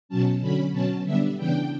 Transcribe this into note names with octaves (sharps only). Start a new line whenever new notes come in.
B2 F#3 C#4 A5
D3 F#3 C#4 B5
B2 F#3 C#4 A5
D3 G3 B3 D4 E5
C#3 E3 B3 D4 G5